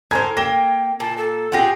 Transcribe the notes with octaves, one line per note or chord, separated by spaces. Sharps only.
A2 A#4 C5 G#5 A#5 G#6
A#3 G5 A#6 E7 G7
A#2 A5
A4
F4 G4 G#4 F#5 A#6